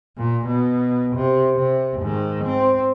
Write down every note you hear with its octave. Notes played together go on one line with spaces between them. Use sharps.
A#2
B2
C3
C3
G#2 D#3
C4